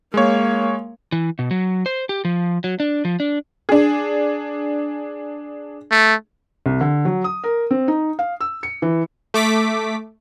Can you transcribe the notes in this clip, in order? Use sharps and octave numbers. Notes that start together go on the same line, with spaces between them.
G#3 A#3 C#5
E3
B2
F#3
C5
G4
F3
F#3
D4
F3
D4
D4 G#4
A3
C2
D3
F#3
D#6
A#4
C4
D#4
F5
E6
C#7
E3
A3 D6 B6